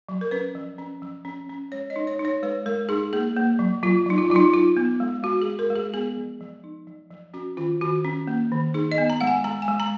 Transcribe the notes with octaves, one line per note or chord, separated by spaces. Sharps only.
F#3
A#4
C#4 B4
F3
C#4
F3
C#4
C#4
G#3 C#5
D#5
D#4
C#5
D#4
C#5
G#3 B4
G#3 A#4
D#4 G#4
A#3 G#4
A#3
F#3
F#3 F4
F#3 D#4
F4
F#3 F4
D#4
D#4 F4
B3
G#3
G#3 F#4
G#3 G#4
A#4
G#3
G#4
B3 G#4
F3
F3
D#4
F3
F3
C#4 F#4
D#3 F4
D#3 F#4
C#4
A#3
D#3
D#4 G#4
D#5
B3
A#5
G#3 F#5
G#5
G#3 A#5
G#5
G#3
A#5